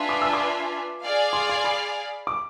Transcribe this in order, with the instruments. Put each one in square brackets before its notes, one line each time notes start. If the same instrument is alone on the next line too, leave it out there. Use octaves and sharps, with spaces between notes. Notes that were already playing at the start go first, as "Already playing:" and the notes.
Already playing: [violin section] D4 F4 B4 E5 G#5
[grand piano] D6
E6
D6
[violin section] G#4 D5 F5
[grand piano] C6
C6
B5
D6